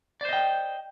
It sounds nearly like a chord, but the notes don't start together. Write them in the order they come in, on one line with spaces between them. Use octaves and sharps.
D5 C5 D#5 G5